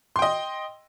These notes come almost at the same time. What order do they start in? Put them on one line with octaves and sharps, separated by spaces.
C6 G5 D#5